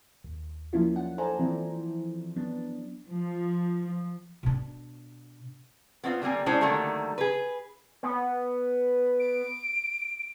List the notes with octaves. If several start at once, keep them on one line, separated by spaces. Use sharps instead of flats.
D#2
F3 F#3 A#3 C#4 E4 F4
D4 F#5
A4 C5 D5 G#5 A#5
E3 F3 C4 E4
F#3 B3 D4
F3
B2 D4
B3 C4 D#4 F4
D3 G3 A#3 C4 G#5
G#3 C#4 D4 E4 G#4 C5
D3 D#3 F#3 G3 A3 A#3
G#4 B4
B3
D7